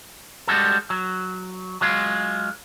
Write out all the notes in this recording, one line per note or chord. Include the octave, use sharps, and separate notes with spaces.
G3 G#3 C#4 F#4 A4
F#3
F#3 G#3 F4